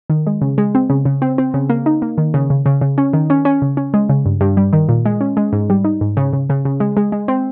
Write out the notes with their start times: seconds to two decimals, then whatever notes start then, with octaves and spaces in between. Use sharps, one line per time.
0.10 D#3
0.27 G#3
0.41 C#3
0.58 G#3
0.75 C4
0.90 C#3
1.05 C#3
1.22 C4
1.38 C4
1.54 C#3
1.70 A#3
1.86 D#4
2.02 A#3
2.18 D#3
2.34 C#3
2.50 C#3
2.66 C#3
2.81 C#3
2.98 C#4
3.13 D#3
3.30 C#4
3.45 C#4
3.62 C#3
3.77 C#4
3.94 G#3
4.09 C#3
4.25 G2
4.41 G2
4.57 G3
4.73 D#3
4.89 A#2
5.05 G#3
5.21 C#4
5.37 G#3
5.53 G#2
5.70 G3
5.84 D#4
6.01 G#2
6.17 C#3
6.33 C#3
6.50 C#3
6.65 C#3
6.80 G#3
6.97 G#3
7.12 G#3
7.28 C4